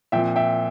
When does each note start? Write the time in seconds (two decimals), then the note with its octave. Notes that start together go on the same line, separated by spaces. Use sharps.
0.12 A#2 F3 C4 E5 G5
0.36 E5 G5